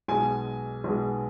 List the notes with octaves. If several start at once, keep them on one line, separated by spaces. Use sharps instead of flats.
B1 B2 G#3 G#5
B1 B2 G#3